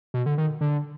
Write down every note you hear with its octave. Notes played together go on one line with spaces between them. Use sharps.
B2
D3
D#3
D3